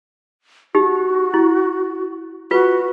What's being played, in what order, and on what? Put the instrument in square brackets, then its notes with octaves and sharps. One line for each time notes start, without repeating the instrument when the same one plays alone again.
[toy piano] D#4 G4 [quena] F#4
[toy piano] E4
[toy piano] F4 B4 [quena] F#4